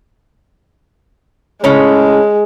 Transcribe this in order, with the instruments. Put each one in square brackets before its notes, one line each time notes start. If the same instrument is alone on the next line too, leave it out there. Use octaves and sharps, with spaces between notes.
[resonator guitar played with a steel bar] A2 C#3 C#4 [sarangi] G#3 [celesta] C#5